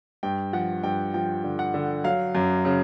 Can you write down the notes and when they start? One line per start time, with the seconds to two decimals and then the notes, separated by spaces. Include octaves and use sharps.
0.23 G2 G5
0.53 F3 F#5
0.83 G2 G5
1.14 F3 G5
1.44 D3
1.59 F#5
1.74 D3
2.04 F#3 F5
2.35 F#2
2.65 C#3